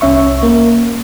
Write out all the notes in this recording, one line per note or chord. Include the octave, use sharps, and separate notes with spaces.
C2 C#4 E5 C#6
A#3